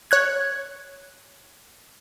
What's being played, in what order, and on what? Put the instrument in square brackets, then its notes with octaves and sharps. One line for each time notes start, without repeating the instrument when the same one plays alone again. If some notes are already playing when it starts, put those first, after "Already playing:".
[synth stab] C#5 F#6 G#6